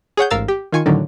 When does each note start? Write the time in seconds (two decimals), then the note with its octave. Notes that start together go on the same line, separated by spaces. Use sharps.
0.17 G#4 C#5 F#5 G6
0.30 A1 G#2 A#4 F5 E6 A6
0.48 G4
0.72 D#3 F4 G#5 C#6 C#7
0.86 A2 D3 D#3 F#3